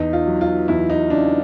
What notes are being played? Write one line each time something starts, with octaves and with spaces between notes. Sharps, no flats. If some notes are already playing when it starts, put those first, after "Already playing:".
Already playing: E2 D#4
F4
F#3
F4
E2 E4
D#4
C#3 D4